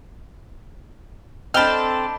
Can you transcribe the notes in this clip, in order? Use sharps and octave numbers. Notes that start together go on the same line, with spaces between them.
C4 D4 A4 D#5 G5 B5 F6